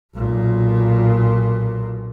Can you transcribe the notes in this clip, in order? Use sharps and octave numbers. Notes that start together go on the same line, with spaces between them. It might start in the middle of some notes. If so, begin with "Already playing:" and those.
B1 A#2